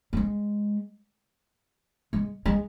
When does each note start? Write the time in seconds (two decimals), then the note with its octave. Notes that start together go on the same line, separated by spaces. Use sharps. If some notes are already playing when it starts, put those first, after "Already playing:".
0.13 G3
0.17 G#3
2.13 G#3
2.46 G#3